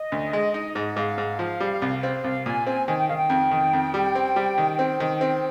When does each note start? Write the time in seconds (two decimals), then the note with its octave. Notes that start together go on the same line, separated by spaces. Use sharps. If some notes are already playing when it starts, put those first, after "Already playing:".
Already playing: D#5
0.12 D2
0.33 G#3
0.54 D#4
0.75 G#2
0.96 G#2 F5
1.18 G#2
1.39 F3
1.60 G3
1.82 C2
2.03 C4
2.24 C2 F5
2.45 A#2 G#5
2.66 C4 G#5
2.87 D#3 G#5
2.98 G5
3.07 D#3 F5
3.17 G5
3.30 F2
3.51 D#3
3.73 F2
3.94 G3
4.15 C4
4.36 G3
4.58 D#3
4.79 C4
5.00 D#3
5.21 C4